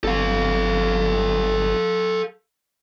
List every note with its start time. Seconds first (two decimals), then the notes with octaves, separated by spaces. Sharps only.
0.04 G1 A4 F5